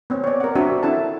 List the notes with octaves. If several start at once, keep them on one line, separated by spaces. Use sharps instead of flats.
B3 C4 C#5
C#5 D5
A#4 F#5
C4 D4 F#4 D5 E5
D4 E4 A4 A5